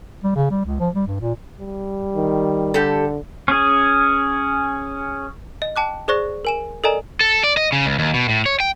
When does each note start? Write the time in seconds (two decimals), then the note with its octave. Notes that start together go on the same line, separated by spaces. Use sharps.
0.24 G3
0.35 C#3
0.51 G3
0.65 C#2
0.80 F3
0.94 G3
1.07 G2
1.20 A#2
1.60 G3
2.16 D#3
2.74 D3 G4 A4
3.48 C#4 G#4
5.62 D#5
5.76 G5 A5 D6 F#6
6.08 G#4 C5 D5 C#6 F#6 A#6
6.45 A#4 G#5 E7
6.84 A4 A#4 D5 D#5 G#5 A#5
7.20 A4
7.44 D5
7.57 D#5
7.72 C#3
7.86 C#2
7.99 D#2
8.14 B2
8.29 A2
8.46 C#5
8.60 G5